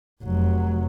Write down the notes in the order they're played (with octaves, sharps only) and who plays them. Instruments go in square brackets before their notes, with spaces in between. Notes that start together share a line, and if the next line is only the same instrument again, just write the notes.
[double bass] F1 F#3